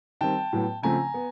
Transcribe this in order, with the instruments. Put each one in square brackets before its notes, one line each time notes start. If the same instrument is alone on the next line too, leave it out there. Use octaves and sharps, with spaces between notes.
[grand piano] D#3 G3 C4 G5 A5
A2 F#3 B3
C#3 F3 A3 C4 G#5 A#5
B3